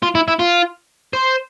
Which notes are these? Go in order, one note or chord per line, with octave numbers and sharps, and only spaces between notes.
F4
E4
E4
F4
C5